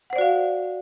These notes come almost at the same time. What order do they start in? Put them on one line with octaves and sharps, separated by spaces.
F#5 C5 D5 F#4 F5